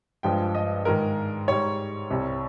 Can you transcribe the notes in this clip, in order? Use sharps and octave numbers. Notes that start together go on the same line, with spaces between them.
G2 F3 G#3 G5
D#5
G#2 D#3 G#3 A#4
G#2 G3 C#5
C2 C3 G3